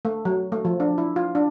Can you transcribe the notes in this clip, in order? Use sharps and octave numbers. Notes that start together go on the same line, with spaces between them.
A3
F#3
A3
F3
D4
E4
F4
D4